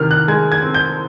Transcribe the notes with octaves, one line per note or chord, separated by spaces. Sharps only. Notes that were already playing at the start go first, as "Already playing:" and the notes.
Already playing: C3 D#3 F6
F#6
G#3 G#6
G#6
C4
G6